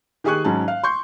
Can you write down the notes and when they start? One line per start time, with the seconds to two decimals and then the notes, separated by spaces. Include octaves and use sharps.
0.24 D#3 G4 G#4 G#5 C#6 F#6
0.44 G#2 F#3 C#4 A5
0.68 F5
0.83 C6 C#6 G6